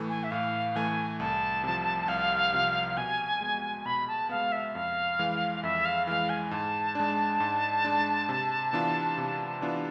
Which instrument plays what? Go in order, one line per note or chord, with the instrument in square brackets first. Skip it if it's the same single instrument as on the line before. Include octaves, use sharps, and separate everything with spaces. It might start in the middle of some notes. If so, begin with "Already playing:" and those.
Already playing: [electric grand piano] A2 E3 A3
[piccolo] G#5
E5
[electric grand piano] A2 [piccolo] F5
[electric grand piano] E3 A3 [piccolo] G#5
[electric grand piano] C2 [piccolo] A5
[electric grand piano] C3 F3
[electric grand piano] C2 [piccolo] F5
[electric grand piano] C3 F3
[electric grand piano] B2 [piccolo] G#5
[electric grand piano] G#3 B3
[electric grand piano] B2 [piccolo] B5
[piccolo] A5
[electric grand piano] G#3 B3 [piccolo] F5
[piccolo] E5
[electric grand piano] F2 [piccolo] F5
[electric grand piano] E3 G#3
[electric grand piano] F2 [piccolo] E5
[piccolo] F5
[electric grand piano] E3 G#3 [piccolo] F5
[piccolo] G#5
[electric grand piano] G#2 [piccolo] A5
[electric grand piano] G#3 D4
G#2
G#3 D4
C3
E3 B3 D4 F4
C3
E3 B3 D4 F4